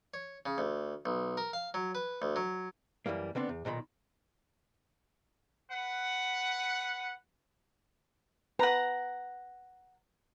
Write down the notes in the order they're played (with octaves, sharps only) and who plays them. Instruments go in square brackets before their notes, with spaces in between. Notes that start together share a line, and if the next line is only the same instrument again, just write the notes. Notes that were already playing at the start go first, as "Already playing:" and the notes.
[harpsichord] C#5
C#3
D2
B1
A#4
F5
F#3
B4
D2
F#3
[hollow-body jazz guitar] F#2 A#2 E3 G3 A#3
D3 B3 C4 D4
E2
B1 A#2 D#3 A#5 B5
[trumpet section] B4 F#5
[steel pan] B4 [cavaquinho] F#5 A#5